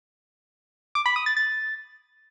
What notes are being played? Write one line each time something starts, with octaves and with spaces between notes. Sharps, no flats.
D6
B5
D#6
A6
A6